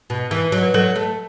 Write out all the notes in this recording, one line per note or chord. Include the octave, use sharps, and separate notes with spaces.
B2
E3 B4
F#3
B4
F#3 A4
A3